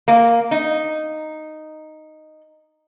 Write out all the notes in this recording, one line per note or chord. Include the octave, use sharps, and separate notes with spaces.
A#3
D#4